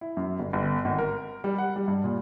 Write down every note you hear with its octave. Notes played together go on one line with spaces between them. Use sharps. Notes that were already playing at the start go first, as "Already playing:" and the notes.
E4
F#2
G1
G1
G#1
A#4
G3
F#5
G3
G2
A#2